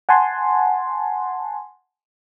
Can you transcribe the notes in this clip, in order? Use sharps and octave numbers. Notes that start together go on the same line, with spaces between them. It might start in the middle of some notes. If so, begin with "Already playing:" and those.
F#5 G#5 A5 C6